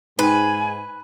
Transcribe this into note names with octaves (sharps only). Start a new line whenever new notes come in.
G#2 D#4 B4 G5 G#5